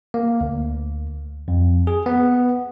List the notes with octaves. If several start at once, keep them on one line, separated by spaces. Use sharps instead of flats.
A#3
D2
F2
G#4
B3